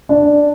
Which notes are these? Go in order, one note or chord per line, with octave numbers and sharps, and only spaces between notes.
D4